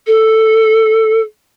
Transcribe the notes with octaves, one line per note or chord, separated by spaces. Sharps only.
A4